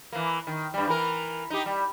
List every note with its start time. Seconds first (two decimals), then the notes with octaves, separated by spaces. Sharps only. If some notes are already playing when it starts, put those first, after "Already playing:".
0.12 E3 A#3
0.47 D#3
0.74 G2 G3
0.87 E3 A#4
1.50 D#4 G4
1.66 G3